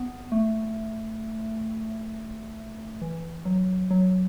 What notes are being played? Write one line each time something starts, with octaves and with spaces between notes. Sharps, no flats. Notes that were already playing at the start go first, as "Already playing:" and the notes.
Already playing: B3
A3
E3
F#3
F#3